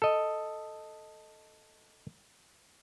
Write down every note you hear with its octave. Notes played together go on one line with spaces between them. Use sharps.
A4 D#5